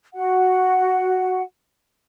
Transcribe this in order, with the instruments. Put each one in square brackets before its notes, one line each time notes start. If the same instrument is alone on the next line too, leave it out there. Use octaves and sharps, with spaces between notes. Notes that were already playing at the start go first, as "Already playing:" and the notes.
[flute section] F#4 F#5